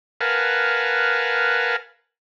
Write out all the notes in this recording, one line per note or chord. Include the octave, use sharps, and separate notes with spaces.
A#4 B4 F5 F#5 G#5 A5